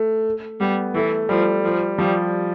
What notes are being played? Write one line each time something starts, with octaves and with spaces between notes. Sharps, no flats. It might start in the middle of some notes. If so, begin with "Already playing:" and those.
Already playing: A3
G3 B3
E3 A3
F3 G3
F3
F3 G3